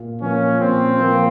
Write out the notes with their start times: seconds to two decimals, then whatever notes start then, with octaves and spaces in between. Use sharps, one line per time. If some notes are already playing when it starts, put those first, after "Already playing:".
Already playing: A#2
0.21 F3 A#3 C#4
0.60 A#2 C4
1.00 F3 A#3